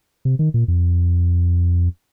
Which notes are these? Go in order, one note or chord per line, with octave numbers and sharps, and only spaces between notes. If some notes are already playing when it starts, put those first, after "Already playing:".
C3
D#3
A#2
F2